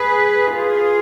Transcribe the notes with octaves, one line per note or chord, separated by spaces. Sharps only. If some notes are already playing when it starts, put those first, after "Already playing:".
Already playing: G#4 B4
F4 G#4